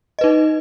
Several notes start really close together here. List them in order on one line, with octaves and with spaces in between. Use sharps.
D#5 B4 D#4